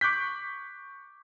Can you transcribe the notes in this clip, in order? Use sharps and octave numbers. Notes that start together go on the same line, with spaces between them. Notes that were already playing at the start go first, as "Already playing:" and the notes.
C#6 D6 F#6 G6 B6